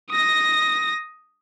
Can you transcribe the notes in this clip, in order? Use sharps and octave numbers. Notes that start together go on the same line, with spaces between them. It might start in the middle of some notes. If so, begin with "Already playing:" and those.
D#6 A#6